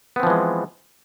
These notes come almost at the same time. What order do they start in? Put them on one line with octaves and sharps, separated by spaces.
B3 C4 F3 E3 G#3